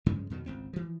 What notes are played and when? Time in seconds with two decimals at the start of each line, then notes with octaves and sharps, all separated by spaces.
0.06 G2 C#3 F3 G#3
0.30 F2 B2 D#3 F#3
0.46 G#1 C#2 C4
0.73 E3 F3